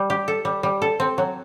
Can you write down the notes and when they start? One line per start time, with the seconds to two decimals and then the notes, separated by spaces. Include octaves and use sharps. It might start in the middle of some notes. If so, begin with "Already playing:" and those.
Already playing: G3
0.10 G4
0.28 A4
0.45 G3
0.63 G3
0.82 A4
1.00 C4
1.18 F#3